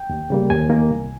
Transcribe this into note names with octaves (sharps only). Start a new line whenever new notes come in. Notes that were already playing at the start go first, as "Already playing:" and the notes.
Already playing: G5
D#2
C#3 G3 A#3
D#2 G#5
D#3 A#3
C2